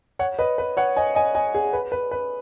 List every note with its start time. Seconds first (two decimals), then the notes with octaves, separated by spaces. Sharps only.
0.19 C#5 F#5
0.39 B4 D#5
0.58 B4
0.77 C#5 F#5
0.96 D#5 G#5
1.15 D#5 G#5
1.35 D#5 G#5
1.55 G#4
1.73 B4
1.92 B4
2.11 B4